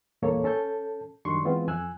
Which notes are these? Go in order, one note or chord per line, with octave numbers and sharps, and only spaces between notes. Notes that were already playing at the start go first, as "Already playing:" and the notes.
E2 G2 A#2 A#3 A4 C#5
C#4 A4 A5 G6
F#2 D#3 G3 D4 C6 C#6
E3 G#3 B3 C4 F4
F2 G#5 E6 F#6